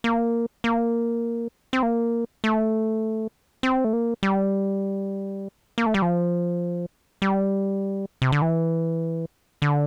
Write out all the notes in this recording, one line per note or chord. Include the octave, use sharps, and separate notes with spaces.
A#3
A#3
C4
A#3
A3
C4
A3
A#3
G3
A#3
A3
G3
F3
G3
C3
D3
E3
D3